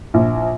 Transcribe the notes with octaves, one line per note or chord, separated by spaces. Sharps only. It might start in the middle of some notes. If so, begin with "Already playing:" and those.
A#1